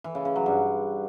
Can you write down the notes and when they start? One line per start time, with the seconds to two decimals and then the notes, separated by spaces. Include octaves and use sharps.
0.04 E3
0.15 C#3
0.25 C#3
0.36 F#3
0.46 G2